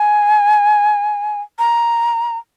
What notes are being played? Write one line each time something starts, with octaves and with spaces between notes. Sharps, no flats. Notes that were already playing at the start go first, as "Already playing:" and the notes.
Already playing: G#5
A#5